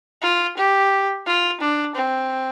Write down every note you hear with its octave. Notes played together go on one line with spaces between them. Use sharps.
F4
G4
F4
D4
C4